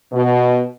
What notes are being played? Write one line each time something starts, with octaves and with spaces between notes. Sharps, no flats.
B2